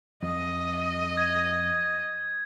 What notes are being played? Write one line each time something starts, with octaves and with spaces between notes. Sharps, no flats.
F2 D#5
G#6